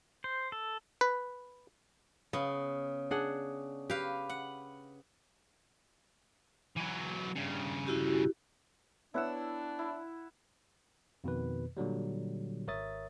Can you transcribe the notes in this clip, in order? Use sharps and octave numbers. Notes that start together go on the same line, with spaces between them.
C5
A4
B4
C#3 B3
D4 G#4 F#5
G4 B4 F5
F#5
E3 F#3
G2 C#3
E4 F#4 G4
B3 D4 E4 C#5 E5 F#5 E6
E4
F2 B2 D#3 B4
A#2 D3 F#3 G3
G#1 A#4 C#5 E5 D#6 A6